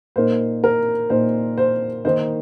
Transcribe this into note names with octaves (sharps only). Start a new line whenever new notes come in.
A#2 A#3 D#4 C5
A#4
A#2 A#3 D#4 C5
C5
D#3 A#3 D#4 C5